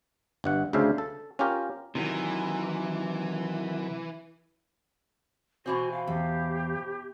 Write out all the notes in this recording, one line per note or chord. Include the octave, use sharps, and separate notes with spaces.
G1 G2 F#5
D2 C#3 D4 C5 E5 F5
A4
C#4 F4 G4 A#4
C3 D#3 E3 F#3
B2 E3 C4 F#4 G#5
F5
E2 G4